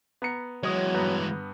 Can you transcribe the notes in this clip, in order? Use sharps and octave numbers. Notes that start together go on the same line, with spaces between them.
B3 A#5 C#7
E3 F#3 G#3 C#5 D#6
G2 B3 A#5